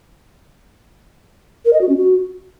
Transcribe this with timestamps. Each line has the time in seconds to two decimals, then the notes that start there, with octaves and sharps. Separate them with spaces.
1.65 A#4
1.73 D#5
1.81 F#4
1.89 C#4
1.97 F#4